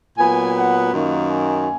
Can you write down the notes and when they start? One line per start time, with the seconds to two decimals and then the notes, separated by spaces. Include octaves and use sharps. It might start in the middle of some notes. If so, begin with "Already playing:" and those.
0.18 A#2 F#3 B3 G#5
0.56 F#5
0.93 F#2 D#3 A#3
1.31 G#5